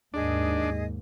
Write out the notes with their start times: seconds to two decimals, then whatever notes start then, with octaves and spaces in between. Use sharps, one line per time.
0.14 D#2 G#2 D4 G#4 D#5